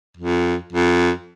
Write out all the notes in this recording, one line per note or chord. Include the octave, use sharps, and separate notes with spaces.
F2
F2